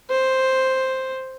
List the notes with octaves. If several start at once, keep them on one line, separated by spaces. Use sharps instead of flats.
C5